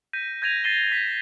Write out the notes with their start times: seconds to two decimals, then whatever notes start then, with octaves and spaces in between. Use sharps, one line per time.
0.13 G6 A#6 B6 D#7
0.42 G6 G#6 A#6 D#7 F7
0.64 A6 A#6 C7 D#7 E7 G7
0.88 B6 D#7